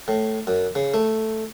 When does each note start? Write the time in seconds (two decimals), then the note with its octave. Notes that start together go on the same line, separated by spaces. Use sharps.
0.08 A2
0.47 F#2
0.75 C#3
0.94 A3